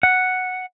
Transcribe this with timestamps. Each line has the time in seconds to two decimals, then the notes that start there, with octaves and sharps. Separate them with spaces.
0.03 F#5